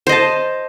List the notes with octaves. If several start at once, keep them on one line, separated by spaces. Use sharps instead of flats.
C5 D#5 A5